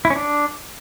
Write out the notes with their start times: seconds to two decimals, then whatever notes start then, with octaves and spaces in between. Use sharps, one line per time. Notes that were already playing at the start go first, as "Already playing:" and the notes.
0.05 E4
0.10 C#4
0.16 D4